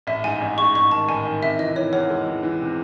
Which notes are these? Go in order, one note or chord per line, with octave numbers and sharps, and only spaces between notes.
A1 E5
G#2 G#5
A1
G#2 C#6
A1 C#6
D#3 A5
A1 G#5
D#3
C3 E5
E3 D#5
E3 C#5
E2 C#5
G#3
E3
E3
C3